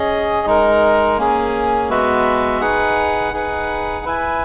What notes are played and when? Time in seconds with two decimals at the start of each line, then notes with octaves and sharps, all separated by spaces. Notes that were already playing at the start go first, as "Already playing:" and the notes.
Already playing: C#4 G#4 D#5
0.46 G#3 D#4 A#4
1.18 A#3 C#4 G#4
1.89 G#3 B3 F#4 B4 E5
2.61 D#4 G#4 B4 F#5
3.33 D#4 G#4 B4 F#5
4.05 E4 B4 E5 G#5